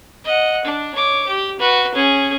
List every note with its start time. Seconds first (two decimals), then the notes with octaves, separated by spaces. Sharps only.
0.25 D#5 F#5
0.65 D4
0.95 C#5 D6
1.27 G4
1.60 F#4 B4
1.95 C#4 G#4